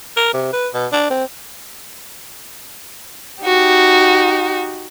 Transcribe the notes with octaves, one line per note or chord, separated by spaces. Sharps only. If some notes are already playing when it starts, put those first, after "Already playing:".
A#4
C3
B4
B2
D4
C4
D#4 F#4 G4